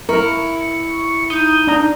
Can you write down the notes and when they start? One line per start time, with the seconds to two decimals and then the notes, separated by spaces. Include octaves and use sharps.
0.09 E4 A#4 C#6
1.30 D#4 D#6 G6
1.67 D4 A#5